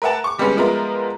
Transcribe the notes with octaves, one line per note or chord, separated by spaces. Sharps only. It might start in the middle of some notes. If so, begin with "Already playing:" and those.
A#4 B4 E5 F#5 A5
C#6 D6
D3 G3 G#3 B3 C#4
F3 G#3 B3 F4 A#4 E5